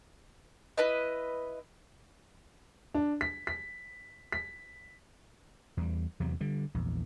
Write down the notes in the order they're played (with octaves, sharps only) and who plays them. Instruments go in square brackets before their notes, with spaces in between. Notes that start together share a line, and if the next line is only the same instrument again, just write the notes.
[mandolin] E4 B4 D#5
[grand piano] D4
B6
B6
B6
[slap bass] E2 G3
E2 C3 F#3
D3 G3
A#1 E2